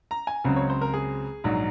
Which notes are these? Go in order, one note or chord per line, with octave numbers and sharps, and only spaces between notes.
A#5
G#5
C#2 C#3 F#3 C4
C#5
C5
A#4
G#4
A#1 G#2 F#3